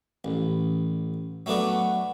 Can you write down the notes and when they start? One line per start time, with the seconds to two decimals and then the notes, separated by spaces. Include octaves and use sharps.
0.24 A1
1.46 F#3 A3 B3 D4 F#4